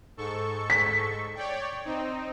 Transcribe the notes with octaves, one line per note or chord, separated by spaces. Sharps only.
G#2 A4 C#6
B6
C#5 D5 G5
C4 D#4